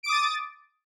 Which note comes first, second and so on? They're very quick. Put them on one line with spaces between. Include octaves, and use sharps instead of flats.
D7 D6 D#6 A6